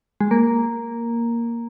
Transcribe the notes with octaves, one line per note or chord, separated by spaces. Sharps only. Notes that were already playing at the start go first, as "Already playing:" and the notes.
G#3
A#3